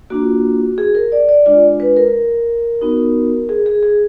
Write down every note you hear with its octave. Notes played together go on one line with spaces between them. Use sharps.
A#3 D4 F4 F#4
G#4
A#4
D5
D5
G#3 D4 F4 D5
B4
A#4
B3 D#4 F#4
G#4
G#4
G#4